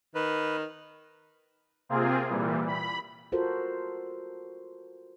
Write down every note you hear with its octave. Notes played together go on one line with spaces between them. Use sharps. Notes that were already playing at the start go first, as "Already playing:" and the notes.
D#3 B4
C3 A#3 C4 F4 G#4
A#2 E3 G3
B5
F4 F#4 A4 A#4 C5